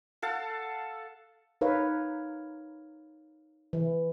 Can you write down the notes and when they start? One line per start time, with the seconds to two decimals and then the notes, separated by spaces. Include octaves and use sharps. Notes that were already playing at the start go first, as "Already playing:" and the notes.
0.22 A4 F5 F#5 A5
1.61 D#4 A#4 B4 C#5 F5
3.73 E3